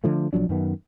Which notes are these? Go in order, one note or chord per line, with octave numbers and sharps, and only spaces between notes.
D3 F3 A3
B1 F3 F#3 D4
F#2 D#3 B3